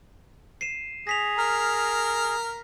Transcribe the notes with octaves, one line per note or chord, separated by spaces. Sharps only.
C7 D#7 E7
G#4 A#6 B6 F7
A#4 F6